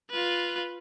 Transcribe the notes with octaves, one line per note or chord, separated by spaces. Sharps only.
F4 B4